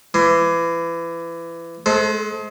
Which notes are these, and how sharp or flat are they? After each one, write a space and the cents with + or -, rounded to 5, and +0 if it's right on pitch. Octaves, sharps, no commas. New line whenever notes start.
E3 +25 C6 +0
G#3 +35 A4 +0 C5 +0